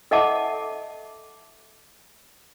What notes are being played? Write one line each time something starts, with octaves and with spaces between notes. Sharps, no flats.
A4 D#5 E5 F#5 A5 D6